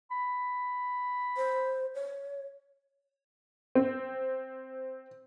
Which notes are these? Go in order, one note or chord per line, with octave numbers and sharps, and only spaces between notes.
B5
C5
C#5
C4